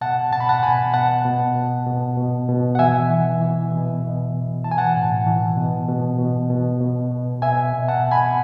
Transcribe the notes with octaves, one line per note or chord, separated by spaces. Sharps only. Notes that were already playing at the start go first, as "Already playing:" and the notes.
B2 F#5 A5
B2 A5
B5
F#5 A5
B2 G#5 B5
B2 F#5 A5
B2
B2
B2
B2
B2
F#5
E3 E5 G#5
E3
E3
B2
B2
B2
E3 A5
G#5
F#5 A5
A2
E3
B2
B2
B2
B2
B2
B2
B2 E5 G#5
B2
F#5 A5
B2
G#5 B5